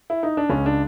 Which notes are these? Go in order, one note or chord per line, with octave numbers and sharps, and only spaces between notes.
E4
D#4
D4
C#2 C#4
D4